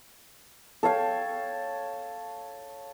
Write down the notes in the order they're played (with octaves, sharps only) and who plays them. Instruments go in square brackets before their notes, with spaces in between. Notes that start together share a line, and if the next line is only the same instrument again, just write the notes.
[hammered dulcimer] A4 C#5 F5 G5